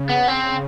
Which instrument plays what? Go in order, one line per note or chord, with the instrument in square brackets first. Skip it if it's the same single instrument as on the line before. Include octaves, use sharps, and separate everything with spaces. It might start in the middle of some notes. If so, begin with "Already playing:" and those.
Already playing: [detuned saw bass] C#3
[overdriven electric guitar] B3
C4